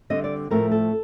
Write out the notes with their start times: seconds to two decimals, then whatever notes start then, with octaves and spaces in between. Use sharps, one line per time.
0.10 D3 G3 C4 D#5
0.24 D5
0.50 A2 F3 A3 C4 A#4
0.71 A4